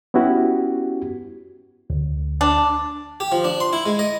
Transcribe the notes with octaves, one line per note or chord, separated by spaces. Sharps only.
B3 C#4 E4 F#4 G4
D2
D4
G4
F3
D4
C6
E4
G#3
D#5